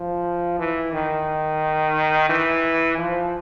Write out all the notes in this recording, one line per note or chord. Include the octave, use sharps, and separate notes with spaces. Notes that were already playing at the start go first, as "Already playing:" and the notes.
Already playing: F3
E3
D#3
E3
F3